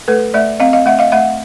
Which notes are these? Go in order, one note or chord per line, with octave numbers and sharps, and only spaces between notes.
A3 A4 B4
A3 D5 E5
C4 D#5 F5
D#5 F5
A3 E5 F#5
D#5 F5
A3 E5 F#5